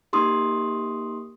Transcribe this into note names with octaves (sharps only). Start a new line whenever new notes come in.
A#3 D#4 G4 C6 D#6